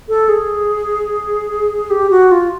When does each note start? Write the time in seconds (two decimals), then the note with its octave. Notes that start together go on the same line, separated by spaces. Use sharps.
0.09 A4
0.29 G#4
1.90 G4
2.10 F#4
2.31 F4